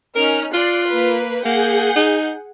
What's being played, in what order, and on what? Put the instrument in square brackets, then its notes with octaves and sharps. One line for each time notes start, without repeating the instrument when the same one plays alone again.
[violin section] C#4 D#4 F6 [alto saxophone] A#4
[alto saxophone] F4 [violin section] D5 C6 F#6
[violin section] A#3 B4
[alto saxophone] A#3 [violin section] G#4 F#5 G6
[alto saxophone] D#4